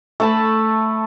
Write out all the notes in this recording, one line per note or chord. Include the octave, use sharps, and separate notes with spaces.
A3 A5 B5